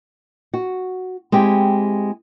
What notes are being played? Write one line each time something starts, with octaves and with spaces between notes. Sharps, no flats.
F#4
G#3 C4 E4 G4